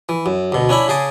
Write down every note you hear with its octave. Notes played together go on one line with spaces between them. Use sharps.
E3
F#2
D2 B2
C#4 D4 E4 B5
C#3 G#4 A5 D6